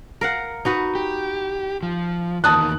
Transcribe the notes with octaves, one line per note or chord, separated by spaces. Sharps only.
A#4 F5 F#5
D#4 F#4 B4
G4
F3
E2 D#3 A#3 A5 D#6 F#6